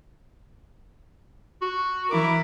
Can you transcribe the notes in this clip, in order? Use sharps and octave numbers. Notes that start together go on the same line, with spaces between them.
F#4
E3 E4 A#4 D6